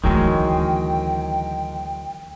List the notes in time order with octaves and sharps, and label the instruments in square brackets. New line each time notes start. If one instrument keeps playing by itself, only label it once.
[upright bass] D2 E3 [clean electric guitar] D#3 F#3 G#3 [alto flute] G5